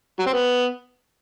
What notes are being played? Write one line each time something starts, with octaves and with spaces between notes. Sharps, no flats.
F#3
C4
B3